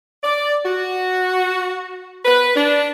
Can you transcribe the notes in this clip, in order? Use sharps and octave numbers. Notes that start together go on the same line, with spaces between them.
D5
F#4
B4
D4